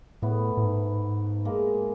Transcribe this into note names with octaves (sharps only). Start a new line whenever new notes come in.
A2 A3 B3
A2
G#2
G#3 A#3